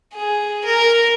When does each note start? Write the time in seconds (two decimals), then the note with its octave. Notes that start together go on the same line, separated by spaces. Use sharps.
0.14 G#4
0.65 A#4